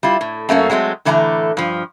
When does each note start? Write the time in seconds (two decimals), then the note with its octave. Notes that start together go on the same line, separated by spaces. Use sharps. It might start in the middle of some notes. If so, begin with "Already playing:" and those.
0.03 G3 E4 F4
0.21 A2
0.49 F#2 A3 A#3 C#4
0.70 F#3 G#3 A3 C4
1.05 A2 D3 E3 A3 G#5 A#5
1.57 G2 F3